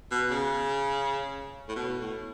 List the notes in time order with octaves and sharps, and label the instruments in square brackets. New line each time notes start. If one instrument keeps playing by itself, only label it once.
[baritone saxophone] B2
C#3
A2
B2
A2